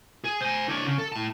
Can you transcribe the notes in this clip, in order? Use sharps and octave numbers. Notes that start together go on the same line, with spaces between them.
G#4
C5 G#5
D4 C#5
C#3
A4
A2 A5